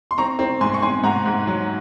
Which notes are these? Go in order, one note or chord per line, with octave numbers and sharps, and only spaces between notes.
C6
C4 A#5 C#6
C4
G#2 G#5 C6
C#6
C4 G#5 C6
G#2 F#5 A#5
G#2
F#3